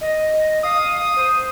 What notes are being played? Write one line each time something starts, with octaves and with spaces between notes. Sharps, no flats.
D#5
F5 D#6
C5